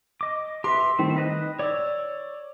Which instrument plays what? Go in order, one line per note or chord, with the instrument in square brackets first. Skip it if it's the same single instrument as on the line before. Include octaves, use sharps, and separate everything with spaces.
[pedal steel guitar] D#5 D6
[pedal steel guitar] G4 B4 E5 [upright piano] C6
[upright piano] D#3 [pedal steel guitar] G3 A3 C4
[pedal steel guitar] B4 D#5 F#6
[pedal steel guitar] C#5 E6 [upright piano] D5